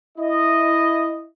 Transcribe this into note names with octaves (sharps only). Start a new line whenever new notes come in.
E4 D#5